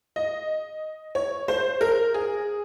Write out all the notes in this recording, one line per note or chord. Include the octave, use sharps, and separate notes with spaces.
D#5
C#5
C5
A#4
G#4